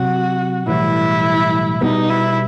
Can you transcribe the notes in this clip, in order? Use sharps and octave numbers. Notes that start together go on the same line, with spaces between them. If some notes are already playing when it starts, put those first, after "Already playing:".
Already playing: C3 F#3 F#4
B1 A2 E3 G3 E4
B2 G3 B3 D#4
E4